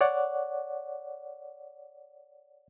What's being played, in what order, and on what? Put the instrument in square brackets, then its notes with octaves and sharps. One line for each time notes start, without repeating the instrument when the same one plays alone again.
[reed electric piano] C#5 D5 F#5